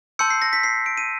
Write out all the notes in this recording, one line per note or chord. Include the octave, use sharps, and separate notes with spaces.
A5 C6 E6 G6 C#7
C7
A#6
B6
C7
D7
D#7